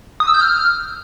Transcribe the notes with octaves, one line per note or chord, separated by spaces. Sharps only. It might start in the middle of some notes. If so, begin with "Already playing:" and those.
D#6
E6
G6
F6